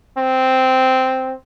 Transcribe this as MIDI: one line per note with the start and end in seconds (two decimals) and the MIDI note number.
0.18 1.33 60